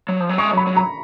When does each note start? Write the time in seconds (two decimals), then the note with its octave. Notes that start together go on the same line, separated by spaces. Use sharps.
0.09 F#3
0.20 F3
0.29 F#3
0.38 G#3 C#6
0.53 F#3 B5
0.67 F#3
0.77 A#5